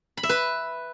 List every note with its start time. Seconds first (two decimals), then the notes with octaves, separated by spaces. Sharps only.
0.17 B5
0.23 E5
0.29 B4